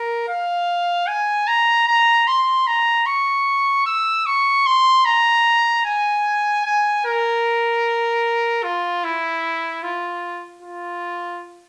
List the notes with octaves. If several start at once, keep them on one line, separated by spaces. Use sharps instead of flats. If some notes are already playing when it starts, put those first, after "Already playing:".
Already playing: A#4
F5
G#5
A#5
A#5
C6
A#5
C#6
E6
C#6
C6
A#5
G#5
G#5
A#4
F4
E4
F4
F4